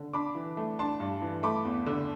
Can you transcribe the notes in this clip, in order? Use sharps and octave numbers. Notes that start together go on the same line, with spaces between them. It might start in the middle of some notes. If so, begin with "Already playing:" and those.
Already playing: D3
D4 B5 D6
E3
A3
D4 A5 C6
G2
E3
A3 B5 D6
E2
D3